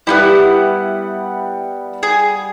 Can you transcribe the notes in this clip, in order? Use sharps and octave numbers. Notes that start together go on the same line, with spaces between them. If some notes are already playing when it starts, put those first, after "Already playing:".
G3 B3 D#4 E4 F#5
G#4